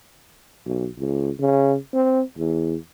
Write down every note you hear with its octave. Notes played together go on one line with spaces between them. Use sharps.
B1
C#2
C#3
C4
E2